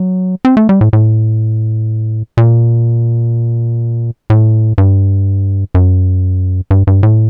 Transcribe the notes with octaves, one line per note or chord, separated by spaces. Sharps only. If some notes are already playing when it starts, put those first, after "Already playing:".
Already playing: F#3
C4
A3
G3
A2
A2
A#2
A2
G2
F#2
G2
G2
A2